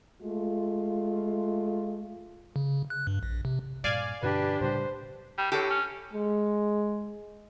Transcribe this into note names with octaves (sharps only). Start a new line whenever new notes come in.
G#3 A3 F4
C#3
F#6
G2
A#1
C3
G2 A#2 D5 F5 G#5
G2 B2 D3 D4 G4 B4
A2 C#3 G3 C5
G3
A2 G4 A4 C#5
C#4
G#3